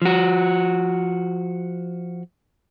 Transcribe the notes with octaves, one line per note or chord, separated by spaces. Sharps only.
F3 F#4